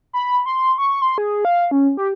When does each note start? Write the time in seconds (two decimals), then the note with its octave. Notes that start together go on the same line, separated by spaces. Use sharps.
0.13 B5
0.46 C6
0.78 C#6
1.02 C6
1.18 G#4
1.45 F5
1.71 C#4
1.97 G4